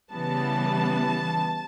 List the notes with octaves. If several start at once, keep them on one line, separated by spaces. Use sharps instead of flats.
C#3 E3 G3 B3 A5